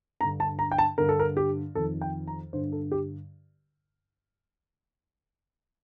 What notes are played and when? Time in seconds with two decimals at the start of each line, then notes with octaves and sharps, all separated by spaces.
0.21 G2 D3 A#5
0.40 A5
0.59 A#5
0.72 G5
0.78 A5
0.98 G2 D3 A#4
1.09 A4
1.19 A#4
1.37 G4
1.75 F2 D#3 A4
2.01 G5
2.27 A#5
2.53 G2 D3 C5
2.72 A4
2.92 G4